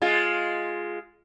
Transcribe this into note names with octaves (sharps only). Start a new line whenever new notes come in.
G#3 F4